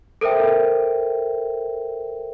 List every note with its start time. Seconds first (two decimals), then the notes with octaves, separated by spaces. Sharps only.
0.21 A4 A#4 C5 E5 G5